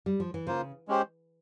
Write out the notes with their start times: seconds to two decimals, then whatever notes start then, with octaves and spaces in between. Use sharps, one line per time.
0.06 G3
0.20 F3
0.34 E3
0.47 C#3 A#3 F4 C5
0.88 G#3 C#4 G4 C5